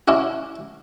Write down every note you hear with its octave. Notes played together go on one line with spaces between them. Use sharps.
C#4 D4 E4 F#4